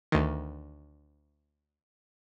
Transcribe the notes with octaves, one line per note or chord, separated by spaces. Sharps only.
D2 D#3